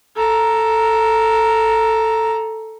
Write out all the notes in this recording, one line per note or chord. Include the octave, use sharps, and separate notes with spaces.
A4 A#5